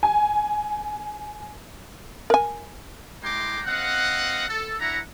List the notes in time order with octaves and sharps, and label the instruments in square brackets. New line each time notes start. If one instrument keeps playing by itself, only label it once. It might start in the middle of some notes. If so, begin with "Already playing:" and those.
[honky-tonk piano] G#5
[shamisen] A#4 G#5
[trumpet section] G#3 E4 G5 A#5 C6 D6
C4 D#5 F5 F#5
A4
D4 E4 E5 F#5 A#5